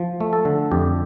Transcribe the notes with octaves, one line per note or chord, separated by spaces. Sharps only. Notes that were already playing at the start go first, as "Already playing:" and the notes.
Already playing: F3
A3
A4
D3
F2 G4